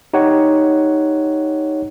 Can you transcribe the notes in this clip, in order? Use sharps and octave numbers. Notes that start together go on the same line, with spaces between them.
D#4 G4 C#5 F#5